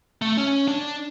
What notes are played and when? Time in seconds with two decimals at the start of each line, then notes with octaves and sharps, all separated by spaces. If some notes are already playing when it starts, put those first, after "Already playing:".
0.22 A3
0.37 C#4
0.68 D4